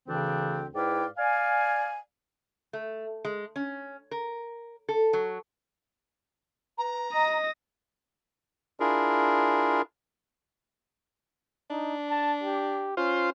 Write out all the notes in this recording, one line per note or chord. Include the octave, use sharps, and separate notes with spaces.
D2 C#3 E3 C4 D4 G5
G#2 E4 B4 D5 F5 G5
D5 F5 G#5
A3
G#3
C#4
A#4
A4
F#3
B4 A#5
D#5 D#6 A#6
D4 E4 F4 G#4 A#4
D4 D#4
A5
G4
C#4 F4 C5